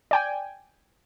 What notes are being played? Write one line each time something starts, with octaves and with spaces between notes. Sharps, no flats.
D5 G5 G#5